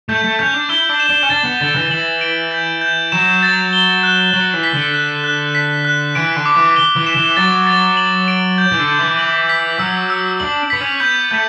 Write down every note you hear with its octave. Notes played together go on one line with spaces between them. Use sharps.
A3 G6
A3
C#4 G6
D4
E4 G7
D4
E7
D4
C#4
D4 A6
B3
D3 A6
E3
E3 F#7
D7
G6
G6
F#3 E7
A6
G7
F#6
F#3 F#7
E3
B6
D3
F#6
F#6
B6
F#6
E3 D7
D3
D6
E3
G7
E3
E7
E3
F#3 A6
A6
F#7
D7
G6
E3
D3
G6
E3
F#7
B6
F#3 E6
E6
D4 F#7
B3 B6
C#4
B3 G6
A3 G6